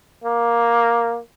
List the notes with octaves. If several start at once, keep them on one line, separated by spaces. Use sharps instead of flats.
A#3